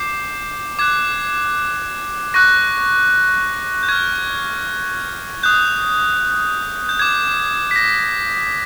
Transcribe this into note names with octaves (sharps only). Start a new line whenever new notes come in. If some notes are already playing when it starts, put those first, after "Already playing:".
Already playing: D6 G6 C7
D6 F#6 G#6
C#6 F#6 A#6
G6
C#6 F6 G#6
D#6 F#6 G6
G6
D6 G6 G#6
B6
A#6